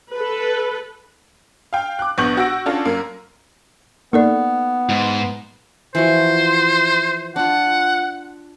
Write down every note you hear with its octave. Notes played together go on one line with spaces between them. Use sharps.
A4 B4
F5 G5
D6 F#6
A#1 B3 C#6 G6 F#7
F#4 F#5 E6 A#6 D7
C#4 D4 F4 A4 A5
F#2 A#3
A#3 B3 D#4 A4 D5
G#2
E3 F3 F#4 C5
D4 F4 F#5